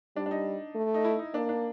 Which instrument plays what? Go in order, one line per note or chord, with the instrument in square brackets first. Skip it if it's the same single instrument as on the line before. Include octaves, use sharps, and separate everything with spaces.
[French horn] G3 [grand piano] D4
[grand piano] D4
D#4
[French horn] A3
[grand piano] D#4
E4
D#4
[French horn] A#3 [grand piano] D4
[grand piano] D4